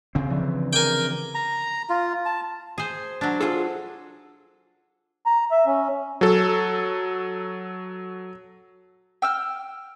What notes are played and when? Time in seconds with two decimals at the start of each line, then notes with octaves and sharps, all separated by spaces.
0.15 C#3 C4
0.30 D3 E3 F3
0.73 A#4 G5 G#5 D6
1.35 A#5
1.90 F4
2.25 A5
2.78 G#4 C5
3.21 F#3 D4
3.41 F4 G#4 A4
5.26 A#5
5.51 E5
5.67 C#4
6.21 F#3 A4
9.22 G5 E6 F6